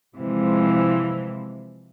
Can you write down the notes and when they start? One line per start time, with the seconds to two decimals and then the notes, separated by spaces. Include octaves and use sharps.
0.16 C3 E3 F3 G#3